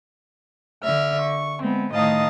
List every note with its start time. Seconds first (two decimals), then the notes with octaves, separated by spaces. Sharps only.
0.83 D3 E5 F6
1.22 C#6
1.62 G#3 B3 C4
1.94 A2 D#3 D#5 F5 A5 D#6